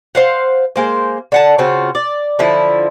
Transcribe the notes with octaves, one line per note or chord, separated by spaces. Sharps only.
C5 F5 F#5
G#3 A#3 C5
D3 F#5 A5
C#3 C4 F4 F#4
D5
D3 F3 E4